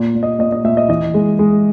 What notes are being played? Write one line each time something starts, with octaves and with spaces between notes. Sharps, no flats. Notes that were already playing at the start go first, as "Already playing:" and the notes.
Already playing: A#2
A#2
D#5
A#2 D#5
D#5
A#2 E5
D#5
E3 D#5
G#3
G#3